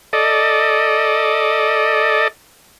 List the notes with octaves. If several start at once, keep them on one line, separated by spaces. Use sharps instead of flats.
A4 D5 D#5